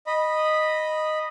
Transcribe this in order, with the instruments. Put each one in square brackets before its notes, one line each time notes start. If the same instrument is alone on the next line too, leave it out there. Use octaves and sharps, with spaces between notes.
[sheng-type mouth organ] D#5 B5